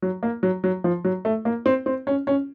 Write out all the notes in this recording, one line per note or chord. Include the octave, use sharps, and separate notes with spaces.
F#3
A#3
F#3
F#3
F3
F#3
A3
A#3
C4
C4
C#4
C#4